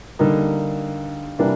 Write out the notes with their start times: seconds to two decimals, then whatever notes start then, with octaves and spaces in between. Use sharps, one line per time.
0.19 D3 G3 A#3 D#4
1.39 C3 E3 G3 A#3 D4